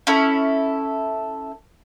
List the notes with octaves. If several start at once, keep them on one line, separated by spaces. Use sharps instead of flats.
C#4 E4 A4